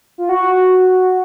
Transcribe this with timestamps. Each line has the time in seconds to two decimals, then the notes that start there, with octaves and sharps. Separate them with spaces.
0.18 F4
0.29 F#4